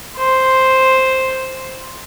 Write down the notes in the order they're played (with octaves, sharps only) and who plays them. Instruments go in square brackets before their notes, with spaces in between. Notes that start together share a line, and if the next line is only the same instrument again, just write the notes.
[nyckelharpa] C5